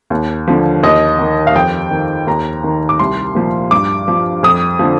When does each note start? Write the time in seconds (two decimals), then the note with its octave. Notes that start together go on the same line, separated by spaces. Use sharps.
0.10 D#2
0.48 D3 F3
0.83 D#2 D#5
1.19 D#3
1.47 F5
1.55 F2 G5
1.91 D#3
2.27 D#2 A#5
2.64 D#3
2.89 D6
2.99 C2 C6
3.35 A#2 F3
3.71 G2 D6
4.08 F3
4.43 F2 D#6
4.79 D3 F3